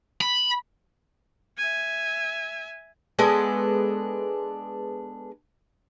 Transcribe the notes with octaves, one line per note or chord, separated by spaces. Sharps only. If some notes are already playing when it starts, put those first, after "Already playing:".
B5
E5 G#5
G#3 B3 D4 A4